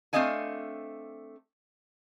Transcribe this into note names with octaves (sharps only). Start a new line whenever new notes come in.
A3 C4 D4 D#5 F5 G#5